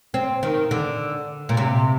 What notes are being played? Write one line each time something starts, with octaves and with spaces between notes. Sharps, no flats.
C4
D#3
D3
A#2
C3